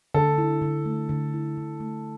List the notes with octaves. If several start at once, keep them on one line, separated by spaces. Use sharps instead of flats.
D3 A4
E4
D3
A3
D3
E4
D3
A3